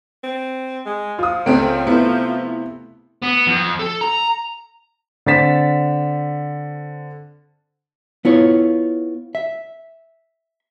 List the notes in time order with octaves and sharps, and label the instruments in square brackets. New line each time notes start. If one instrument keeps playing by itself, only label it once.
[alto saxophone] C4
G#3
[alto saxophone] F3 [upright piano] F4 D#6
[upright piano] C#2 D7 [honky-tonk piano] A3 C4 C#4
[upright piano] C3 A3 [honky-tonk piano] B3 E4
[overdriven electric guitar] B3
F2
A4
A#5
[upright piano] D3 C4 A6 B6 E7
[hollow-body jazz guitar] B3 E4 F4 C#5
E5